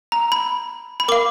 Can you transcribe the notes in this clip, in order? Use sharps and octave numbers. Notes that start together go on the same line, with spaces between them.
A#5
B5
B5
A#4 F5 D6